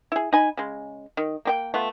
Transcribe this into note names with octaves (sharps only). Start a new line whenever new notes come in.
E4 G#4
D#4 G#5 B5
C#3 G#3
D#3
A#3 G4 G5
A3 B3 F4